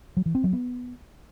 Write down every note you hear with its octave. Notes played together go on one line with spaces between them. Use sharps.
F#3
E3
C4
F#3
B3